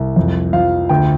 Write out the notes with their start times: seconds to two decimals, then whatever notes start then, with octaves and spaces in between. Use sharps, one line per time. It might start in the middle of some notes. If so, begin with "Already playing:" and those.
Already playing: C2
0.16 F2
0.53 F3 F5
0.89 D2 G5